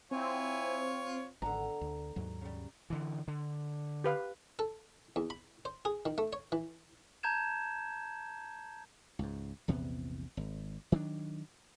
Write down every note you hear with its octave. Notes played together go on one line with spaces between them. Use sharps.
C4 E4 F4 C#5 G#5
G#1 D3 B3 D4 A#5
D2
D#2 G#2 F#3
C#3 G3
D3 E3
D3
G4 B4 F5
A4
E2
B5
C5
G#4
D#3
A3
C#5
E3
A5 A#5 G6 G#6 E7
C#2 G#2
A#1 E2 C3 B3
G#1
D#3 F#3 C#4 D4